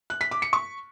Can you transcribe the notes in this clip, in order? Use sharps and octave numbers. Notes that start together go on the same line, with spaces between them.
F#6
B6
D6
C#7
C#6